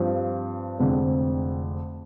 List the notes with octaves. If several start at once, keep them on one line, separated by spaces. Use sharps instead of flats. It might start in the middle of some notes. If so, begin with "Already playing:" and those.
Already playing: G2 F3 C4
F1 F2 D3 G#3 C4